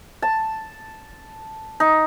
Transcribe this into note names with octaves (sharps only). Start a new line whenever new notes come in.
A5
D#4